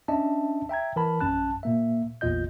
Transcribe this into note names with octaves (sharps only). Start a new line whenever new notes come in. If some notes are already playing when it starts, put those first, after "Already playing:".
C#4 D4 D#5 E5 A5
E5 G5 A#5 G#6
E3 A#4 A5 B5
A#1 F#2 C#4 A5 F#6
A#2 A#3 E5
A1 E2 A#2 F4 D#5 G6